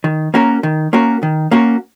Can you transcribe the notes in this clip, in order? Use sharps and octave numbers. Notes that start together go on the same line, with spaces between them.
D#3
A#3 C#4 F#4 A#4
D#3
A#3 C#4 F#4 A#4
D#3
A#3 C#4 F#4 A#4